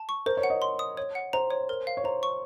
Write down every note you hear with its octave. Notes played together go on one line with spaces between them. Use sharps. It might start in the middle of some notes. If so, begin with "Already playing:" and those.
Already playing: A5
C#6
A#4 C5
C#5
F#5
D#5
C6
D#6
C#5
F#5
C5 A#5
C#5
A#4
F5
C#5
C5 A#5
C#6